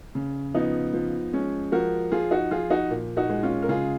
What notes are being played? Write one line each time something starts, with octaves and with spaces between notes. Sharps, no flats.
C#3
F3 B3 D#4
F3
G#3 C#4
F3 F#4 A#4
F3 F4 G#4
D#4 F#4
F3 F4 G#4
D#4 F#4
A#2
D#4 F#4
G#3
C#4 F4
A#4
C#3 F4 G#4